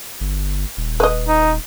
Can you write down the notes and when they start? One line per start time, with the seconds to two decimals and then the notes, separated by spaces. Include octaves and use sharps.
0.21 G1
0.77 D#1
1.00 B4 D#5
1.28 D#4